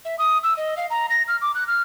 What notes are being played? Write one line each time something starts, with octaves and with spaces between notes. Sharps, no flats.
E5
D#6
E6
D#5
F5
A#5
A#6
F6
D6
F#6
F6